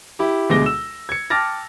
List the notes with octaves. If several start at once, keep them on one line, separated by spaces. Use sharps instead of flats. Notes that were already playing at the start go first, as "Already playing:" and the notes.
E4 G4
D2 B2 G#3 D6 A#6 G7
E6 E7
G#6 C#7
G5 A5 D6 F6 A6 A#6